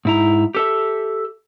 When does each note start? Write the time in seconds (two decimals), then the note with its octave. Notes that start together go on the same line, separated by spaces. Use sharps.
0.05 G#2 E4 A#5
0.55 G4 A4 E5